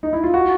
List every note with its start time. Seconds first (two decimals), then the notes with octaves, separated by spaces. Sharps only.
0.03 D#4
0.13 E4
0.24 F4
0.34 F#4